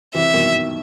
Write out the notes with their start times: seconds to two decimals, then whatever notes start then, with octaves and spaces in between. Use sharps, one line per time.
0.14 C3 E3 E5
0.34 B2 D#3